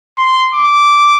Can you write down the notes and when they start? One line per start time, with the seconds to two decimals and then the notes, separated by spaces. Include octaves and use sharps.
0.18 C6
0.54 D6